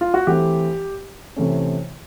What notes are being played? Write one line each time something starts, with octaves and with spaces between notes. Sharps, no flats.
F4
F#4
E3 A3 C4 G4
C3 E3 A3 C#4